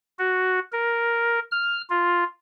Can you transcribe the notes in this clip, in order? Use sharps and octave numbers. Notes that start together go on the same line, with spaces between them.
F#4
A#4
F6
F4